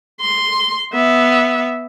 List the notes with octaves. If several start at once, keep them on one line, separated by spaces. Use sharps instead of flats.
C6
B3 E5